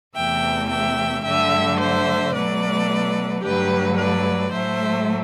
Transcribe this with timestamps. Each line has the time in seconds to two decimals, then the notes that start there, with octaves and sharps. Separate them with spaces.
0.16 E2 C3 E3 A3 E5 G5
0.70 E5 G5
1.25 G2 D3 F#3 A3 E5 G5
1.79 C5 E5
2.34 B2 F#3 A3 B4 D5
3.43 G2 D3 F#3 A3 G4 B4
3.97 B4 D5
4.52 A2 F#3 A3 C5 E5